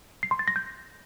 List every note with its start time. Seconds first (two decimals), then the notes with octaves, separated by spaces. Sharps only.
0.23 C7
0.31 C6
0.39 A6
0.48 A#6
0.56 G6